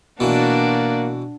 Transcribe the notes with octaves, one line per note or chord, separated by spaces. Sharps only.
B2 E3 A#3 D4 F#4 D5